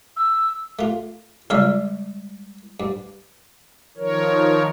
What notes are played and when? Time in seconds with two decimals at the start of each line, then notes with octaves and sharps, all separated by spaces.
0.16 E6
0.79 A3 F4
1.50 C#2 G3 G#3 C#5 D5 F5
2.80 G2
3.97 D#3 F3 A#4 C#5